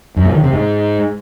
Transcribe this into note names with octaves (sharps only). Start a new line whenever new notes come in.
F#2
A#2
D#3
C3
G#2